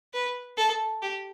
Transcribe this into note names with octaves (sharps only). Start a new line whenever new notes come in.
B4
A4
G4